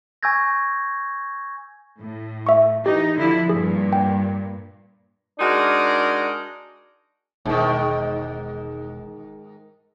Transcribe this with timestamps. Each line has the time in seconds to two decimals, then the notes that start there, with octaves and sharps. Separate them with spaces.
0.23 G#5 C#6 E6 G6 G#6 A#6
2.00 A2
2.47 E5 C#6
2.86 E3 D#4 G4
3.16 D3 F3 E4
3.49 G2 A#2 G#4
3.93 G5
5.39 G#3 D4 D#4 F#4 G#4 A#4
7.46 E1 G#2 D#3